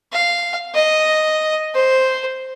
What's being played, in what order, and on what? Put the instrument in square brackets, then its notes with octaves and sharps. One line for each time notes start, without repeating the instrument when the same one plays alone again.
[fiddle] F5
D#5
C5